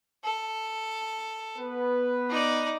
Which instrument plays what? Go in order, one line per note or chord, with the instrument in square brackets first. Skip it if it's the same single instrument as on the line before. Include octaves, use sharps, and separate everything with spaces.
[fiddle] A4
[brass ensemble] B3 B4
[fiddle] D#4 D5